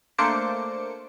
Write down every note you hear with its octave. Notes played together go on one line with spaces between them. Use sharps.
A3 A#3 D4 C5 D6 C#7